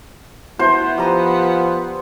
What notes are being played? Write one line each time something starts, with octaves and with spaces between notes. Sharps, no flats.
B3 E4 F#4 C5
F3 G3 A#5 D#6